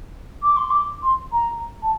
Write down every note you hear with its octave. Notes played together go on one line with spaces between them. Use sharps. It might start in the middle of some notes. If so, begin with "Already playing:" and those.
D6
C6
D6
C6
A#5
A5